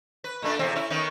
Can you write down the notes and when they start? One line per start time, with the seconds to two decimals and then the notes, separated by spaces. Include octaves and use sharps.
0.24 B4
0.42 A#2 A3 D4
0.59 E2 C3 C4
0.76 C#4 E4
0.90 D#3 B3 C#4